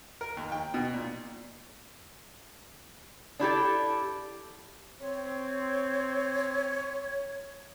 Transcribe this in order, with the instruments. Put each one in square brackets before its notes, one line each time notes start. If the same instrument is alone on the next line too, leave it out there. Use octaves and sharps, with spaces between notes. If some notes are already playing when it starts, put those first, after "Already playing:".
[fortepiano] A#4
D#2
G5
B2
A#2
[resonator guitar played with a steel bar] D4 E4 G4 A4
[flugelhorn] C4 [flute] C#5